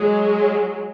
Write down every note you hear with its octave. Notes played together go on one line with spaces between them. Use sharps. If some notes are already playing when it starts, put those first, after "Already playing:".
Already playing: F#3 G#3